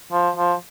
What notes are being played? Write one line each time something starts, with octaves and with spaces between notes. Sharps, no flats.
F3
F3